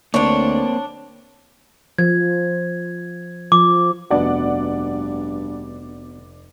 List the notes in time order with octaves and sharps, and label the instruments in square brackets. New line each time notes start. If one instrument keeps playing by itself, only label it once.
[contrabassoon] D2 [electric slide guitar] A#3 C4 [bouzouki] D4 C#5 [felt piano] D5
[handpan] F3 [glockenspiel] G#6
[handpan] F3 [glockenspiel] D6
[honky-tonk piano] F1 D5 F#5 [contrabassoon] G2 [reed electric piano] B3 D4 F#4